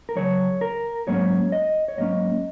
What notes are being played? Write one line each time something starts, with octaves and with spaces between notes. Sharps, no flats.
A#4
F#2 C#3 F#3 C#5
A#4
G#2 F#3 A#3 C#4 C#5
D#5
C#5
G#2 F#3 A#3 C#4 D#5